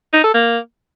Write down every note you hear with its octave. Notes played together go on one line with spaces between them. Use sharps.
D#4
A4
A#3